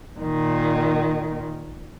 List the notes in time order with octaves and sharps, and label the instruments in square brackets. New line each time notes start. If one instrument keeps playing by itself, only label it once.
[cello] A#2 D#3